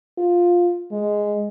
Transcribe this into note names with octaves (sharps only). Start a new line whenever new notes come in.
F4
G#3